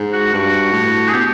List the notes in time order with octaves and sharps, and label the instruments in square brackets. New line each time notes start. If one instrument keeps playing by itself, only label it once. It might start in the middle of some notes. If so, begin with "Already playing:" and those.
Already playing: [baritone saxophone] G#2
[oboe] F#4
[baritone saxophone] G2 [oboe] F#4
[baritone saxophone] A2
[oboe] G#4
[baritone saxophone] B2 [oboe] G4